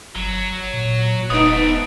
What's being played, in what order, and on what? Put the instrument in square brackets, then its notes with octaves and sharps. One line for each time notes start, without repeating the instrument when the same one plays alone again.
[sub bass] G1 [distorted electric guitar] F#3
[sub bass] A#2
[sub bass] E1 [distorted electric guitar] G#2 A3 [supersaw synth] B3 D#4 [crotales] D#6 D7